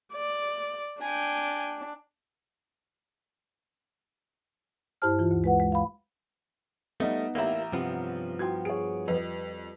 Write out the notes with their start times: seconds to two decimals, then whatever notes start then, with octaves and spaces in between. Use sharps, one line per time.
0.13 D5
1.02 D4 G5 G#5
5.02 G2 E4 G4 C5 A5 F6
5.19 E3 F4
5.31 D2
5.44 G#3 B4 F#5
5.60 G#3
5.72 F5 B5
7.00 G3 A3 B3 D#4 D#5
7.35 A1 A#3 E4 G4 D#5 E5 A#5
7.72 G2 C3 F3 B3
8.39 E4 F#4 G5 C6 D#6 G#6
8.65 G#4 C#5 D7
9.08 F2 G3 B4 D#5